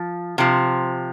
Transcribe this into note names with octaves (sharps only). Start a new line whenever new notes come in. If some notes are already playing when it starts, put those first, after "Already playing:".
Already playing: F3
C3 F3